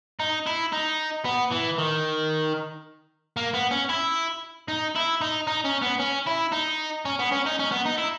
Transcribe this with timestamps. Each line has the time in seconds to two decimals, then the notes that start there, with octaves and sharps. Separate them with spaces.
0.20 D#4
0.47 E4
0.73 D#4
1.25 B3
1.52 E3
1.78 D#3
3.37 A#3
3.54 B3
3.71 C#4
3.89 E4
4.68 D#4
4.95 E4
5.21 D#4
5.47 D#4
5.65 C#4
5.82 B3
6.00 C#4
6.27 E4
6.52 D#4
7.05 C#4
7.19 B3
7.32 C#4
7.46 D#4
7.59 C#4
7.71 B3
7.85 D#4
7.98 E4